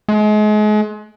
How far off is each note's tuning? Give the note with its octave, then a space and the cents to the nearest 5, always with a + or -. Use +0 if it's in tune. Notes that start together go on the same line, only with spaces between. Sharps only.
G#3 +35